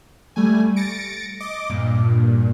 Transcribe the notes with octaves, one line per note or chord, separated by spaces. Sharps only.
G3 A3 G#5
A6 A#6 C#7 D7
D#5 D6
G2 A#2